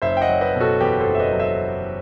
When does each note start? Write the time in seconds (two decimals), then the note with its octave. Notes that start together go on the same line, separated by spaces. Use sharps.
0.02 F#1 C5 E5
0.17 G5
0.21 D#5 F#5
0.28 F#3
0.41 B4 D#5
0.54 B2
0.60 F#4 A4
0.81 E2 G4 B4
1.00 A4 C5
1.06 F#1
1.15 E5
1.20 B4 D#5
1.33 F#3
1.40 C5 E5